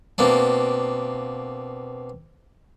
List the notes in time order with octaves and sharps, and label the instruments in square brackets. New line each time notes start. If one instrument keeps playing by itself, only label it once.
[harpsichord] B2 A#3 C4 D4